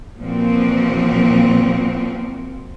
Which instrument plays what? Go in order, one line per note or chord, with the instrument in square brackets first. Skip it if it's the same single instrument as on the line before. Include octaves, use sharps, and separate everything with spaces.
[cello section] A#2 E3 F3 A#3 C4 F#4